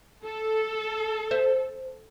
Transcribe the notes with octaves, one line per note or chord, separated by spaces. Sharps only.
A4
C5 E5